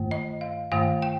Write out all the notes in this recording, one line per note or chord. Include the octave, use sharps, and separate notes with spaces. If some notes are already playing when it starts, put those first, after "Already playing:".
Already playing: G2 D#3 A3
D#5
F5
G2 D#3 A3 F5
G5